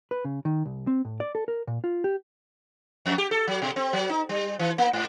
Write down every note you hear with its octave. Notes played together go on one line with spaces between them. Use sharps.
B4
C#3
D#3
C2
C4
A2
D5
A4
A#4
A#2
F4
G4
F2
G4
A4
F#3
B2
C4
F#3
D#4
G3
E3
A#3
G#2